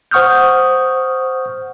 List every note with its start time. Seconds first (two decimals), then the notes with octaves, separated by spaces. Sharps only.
0.11 C5 F#5 C#6 D#6 F6 G6